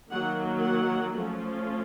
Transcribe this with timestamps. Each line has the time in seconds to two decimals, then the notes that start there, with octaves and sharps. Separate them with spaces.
0.11 D#3 F#3 A#3 F#5
0.64 F#5
1.17 F3 A3 C#4 F4